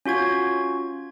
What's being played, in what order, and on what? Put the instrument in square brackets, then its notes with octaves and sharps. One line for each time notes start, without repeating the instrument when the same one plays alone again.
[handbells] C#4 F4 F#4 G#6